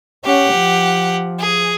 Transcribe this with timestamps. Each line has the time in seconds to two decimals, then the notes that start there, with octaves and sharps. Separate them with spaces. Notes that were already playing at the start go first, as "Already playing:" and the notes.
0.25 C#4 G4 F#5
0.54 F3
1.39 G#4